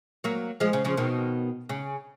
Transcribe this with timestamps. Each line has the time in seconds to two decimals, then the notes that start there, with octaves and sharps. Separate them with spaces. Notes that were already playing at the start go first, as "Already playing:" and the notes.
0.24 F#3 A#3
0.60 F3 G#3
0.73 C#3
0.84 C#3 F3
0.97 B2 D#3
1.69 C#3